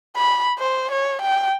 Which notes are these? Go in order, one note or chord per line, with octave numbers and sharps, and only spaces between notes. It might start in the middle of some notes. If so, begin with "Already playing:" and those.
B5
C5
C#5
G5